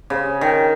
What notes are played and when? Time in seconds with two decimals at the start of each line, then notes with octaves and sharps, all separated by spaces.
0.10 C#3
0.41 D#3